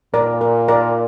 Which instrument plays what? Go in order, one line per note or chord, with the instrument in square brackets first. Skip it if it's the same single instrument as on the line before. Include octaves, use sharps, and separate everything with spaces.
[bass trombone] A#2 [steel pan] A#4 D5
[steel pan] A#4
A#4 D5